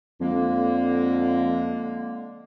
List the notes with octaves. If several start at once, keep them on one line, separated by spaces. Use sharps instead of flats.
F2 D3 G#3 A#3